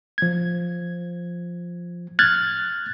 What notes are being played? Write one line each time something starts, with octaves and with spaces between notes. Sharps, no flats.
F3 G#6
F6 F#6 G#6 A6